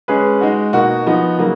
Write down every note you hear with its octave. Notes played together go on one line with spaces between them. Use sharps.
G#3 C#4 G#4 B4
G#3 D#4 F#4
B2 A#3 D#4 F#4 A#4
F3 B3 D#4 F#4
C#3 F#3 A#3 D#4 F#4